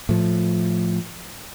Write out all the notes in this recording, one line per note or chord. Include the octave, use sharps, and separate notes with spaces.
A2 F3